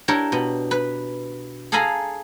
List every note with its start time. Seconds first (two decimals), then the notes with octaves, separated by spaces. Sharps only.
0.08 D4 E4 G4 A#4 C#5
0.32 B2
0.71 B4
1.72 G#4 A4 F5 G#5 A#5 B5